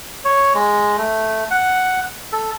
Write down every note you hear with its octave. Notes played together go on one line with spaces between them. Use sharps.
C#5
G#3
A3
F#5
A4